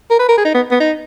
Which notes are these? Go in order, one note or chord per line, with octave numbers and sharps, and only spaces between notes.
A#4
B4
A#4
G#4
D#4
B3
B3
D#4